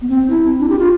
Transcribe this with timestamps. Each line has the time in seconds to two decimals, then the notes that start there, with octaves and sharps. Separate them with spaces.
0.02 B3
0.09 C4
0.30 E4
0.59 D4
0.69 G4
0.79 F4